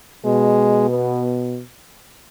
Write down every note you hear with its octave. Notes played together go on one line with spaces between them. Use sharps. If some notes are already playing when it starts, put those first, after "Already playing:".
B2 G#3
B3